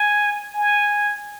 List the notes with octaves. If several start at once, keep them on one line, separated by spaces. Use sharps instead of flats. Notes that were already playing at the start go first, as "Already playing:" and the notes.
Already playing: G#5
G#5